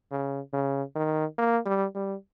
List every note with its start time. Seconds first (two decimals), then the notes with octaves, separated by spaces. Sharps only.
0.11 C#3
0.53 C#3
0.96 D#3
1.38 A#3
1.66 G3
1.95 G3